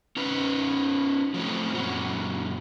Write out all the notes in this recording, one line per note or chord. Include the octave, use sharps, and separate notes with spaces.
C#4 D#4 B4
F3 F#3 A3 C4
F#2 A#2 F#3